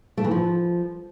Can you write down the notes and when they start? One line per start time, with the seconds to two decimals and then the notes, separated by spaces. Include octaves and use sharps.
0.17 A3
0.24 E3
0.31 F3